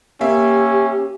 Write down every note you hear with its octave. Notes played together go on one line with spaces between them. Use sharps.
A#3 C#4 G4 E5